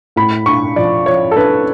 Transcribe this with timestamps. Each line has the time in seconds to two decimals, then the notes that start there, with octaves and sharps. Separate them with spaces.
0.16 A2 B5
0.46 D4 C#6
0.76 F3 D5
1.06 F3 C#5
1.31 A4
1.36 D4 B4